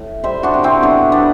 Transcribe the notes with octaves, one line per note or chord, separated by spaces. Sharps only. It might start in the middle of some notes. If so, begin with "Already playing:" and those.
Already playing: A2
G3 C5 E5
D4 F#4
C3
C4 E4
A2 B3 D4
G3 B3 D4